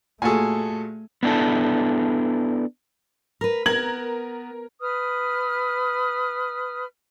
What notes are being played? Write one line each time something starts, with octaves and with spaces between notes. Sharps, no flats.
A#2 A3 F#4 G#4 A4 G#5
B3 D4 E4 A4
A#4 B4
B3 A#4 G#6 F#7
B4 D#6 F6